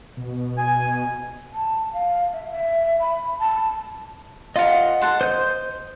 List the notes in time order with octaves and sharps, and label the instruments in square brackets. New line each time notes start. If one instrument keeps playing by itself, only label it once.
[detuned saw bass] B2
[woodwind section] G#5
[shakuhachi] A5
F5
E5
E5
B5
A5
[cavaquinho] F4 A#4 [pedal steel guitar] D#5 F#5
[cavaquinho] A4 F#5 C6
[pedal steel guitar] C5 G6 [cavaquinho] D#5